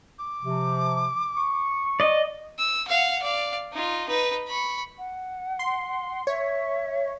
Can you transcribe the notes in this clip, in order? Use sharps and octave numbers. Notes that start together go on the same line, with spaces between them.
D6
C3 F3
C#6
D5 D#5
E6
F5 F#5
D5 F5
D#4 F4
D#4 B4
B5 C#6
F#5
C6
C#5 E5